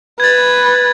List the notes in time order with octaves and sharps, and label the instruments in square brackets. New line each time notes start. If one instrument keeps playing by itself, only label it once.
[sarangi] B4 [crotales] G#6 A6